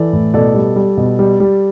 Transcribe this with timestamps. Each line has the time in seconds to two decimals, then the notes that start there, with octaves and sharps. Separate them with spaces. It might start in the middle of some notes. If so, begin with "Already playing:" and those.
Already playing: E3 A4 D5
0.13 A2
0.34 B2 A4 D5
0.54 G3
0.76 G3
0.97 B2
1.19 G3
1.40 G3